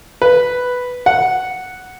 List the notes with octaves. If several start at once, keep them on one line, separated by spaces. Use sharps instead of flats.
B4
F#5